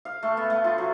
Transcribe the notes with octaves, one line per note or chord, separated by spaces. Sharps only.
F5
A3
B3
A3
F4
F#3